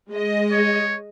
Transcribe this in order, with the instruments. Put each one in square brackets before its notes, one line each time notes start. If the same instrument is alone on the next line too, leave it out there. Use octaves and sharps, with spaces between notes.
[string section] G#3 D#5
[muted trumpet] C#5